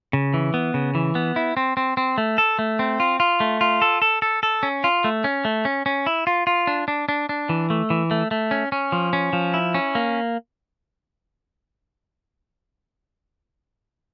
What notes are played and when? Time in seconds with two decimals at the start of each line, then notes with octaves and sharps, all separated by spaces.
0.13 C#3
0.34 E3
0.54 B3
0.74 C#3
0.95 E3
1.15 B3
1.36 E4
1.57 C4
1.77 C4
1.97 C4
2.18 A3
2.38 A4
2.59 A3
2.79 C4
3.00 F4
3.20 F4
3.40 A3
3.61 F4
3.82 A4
4.02 A4
4.22 A4
4.43 A4
4.63 C#4
4.84 F4
5.04 A3
5.24 C#4
5.45 A3
5.65 C#4
5.86 C#4
6.06 E4
6.27 F4
6.47 F4
6.67 D4
6.88 D4
7.09 D4
7.29 D4
7.49 E3
7.70 A3
7.90 E3
8.11 A3
8.31 A3
8.51 C#4
8.72 C#4
8.92 F3
9.13 C#4
9.33 F3
9.54 E4
9.74 C#4
9.95 A#3